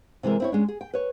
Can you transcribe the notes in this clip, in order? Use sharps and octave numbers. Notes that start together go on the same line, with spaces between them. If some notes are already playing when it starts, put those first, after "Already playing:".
C3 E3 G#3 A#4
C4 E4 C#5
G#3 C#4 D4
G#4
G5
B4 C#5